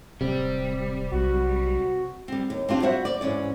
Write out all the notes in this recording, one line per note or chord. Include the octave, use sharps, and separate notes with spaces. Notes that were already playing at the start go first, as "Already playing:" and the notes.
D1 C3 G3
B1 F#4
G3 C4
D#2
C4 D4 F4 G4
G3 F#4 C5 E5 F#5
D5
G#2 E3 C#4 D5